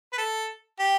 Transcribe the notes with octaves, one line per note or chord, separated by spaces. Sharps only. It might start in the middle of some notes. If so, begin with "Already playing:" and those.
B4
A4
G4